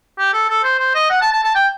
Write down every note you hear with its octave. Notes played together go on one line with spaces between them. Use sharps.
G4
A4
A4
C5
C5
D#5
F#5
A5
A5
A5
G5